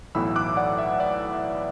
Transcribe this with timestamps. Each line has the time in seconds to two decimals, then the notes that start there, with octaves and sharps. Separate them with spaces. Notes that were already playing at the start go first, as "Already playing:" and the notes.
0.15 B1 A2 E3 B3 B5 E6
0.36 D6 F#6
0.57 D5 F#5
0.78 E5
1.00 D5